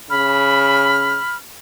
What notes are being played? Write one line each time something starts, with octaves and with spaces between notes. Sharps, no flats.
C#3 B5 F6